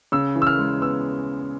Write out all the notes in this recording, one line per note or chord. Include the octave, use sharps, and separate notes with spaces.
C#3 E6
E3
E6
F6
G#3
B3 E6